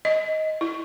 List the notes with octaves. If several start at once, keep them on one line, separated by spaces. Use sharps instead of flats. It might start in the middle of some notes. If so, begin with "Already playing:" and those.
D#5
E4